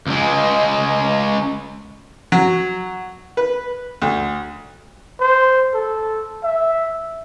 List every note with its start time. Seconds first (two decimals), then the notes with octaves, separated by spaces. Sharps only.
0.07 C#2 G#3
2.32 F#3
3.37 B4
4.02 D2
5.20 C5
5.74 A4
6.44 E5